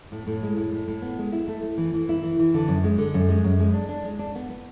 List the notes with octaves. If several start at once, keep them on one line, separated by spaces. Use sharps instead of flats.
A2
A2
G#3
A2
A2
A2
B3
G#3
E4
A3
A3
E3
E3
E4
E3
E3
D3
F#2
G#3
D3
F#2
G#3
F#2
G#3
D4
D4
G#3
D4
B3
B3